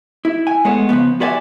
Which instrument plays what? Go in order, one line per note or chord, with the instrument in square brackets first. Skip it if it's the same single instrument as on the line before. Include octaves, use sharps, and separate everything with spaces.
[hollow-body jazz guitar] E4
G#5
G#3 A3 B3 C#5
C#3 E3 F3 B3
F4 F#4 B4 D5 E5 G#5